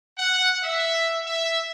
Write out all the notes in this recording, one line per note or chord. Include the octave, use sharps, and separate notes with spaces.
F#5
E5
E5